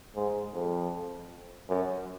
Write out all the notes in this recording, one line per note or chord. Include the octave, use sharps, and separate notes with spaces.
G#2
F2
F#2